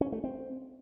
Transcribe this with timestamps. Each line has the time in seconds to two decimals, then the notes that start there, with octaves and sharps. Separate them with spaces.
0.01 C#4
0.12 A3
0.24 C4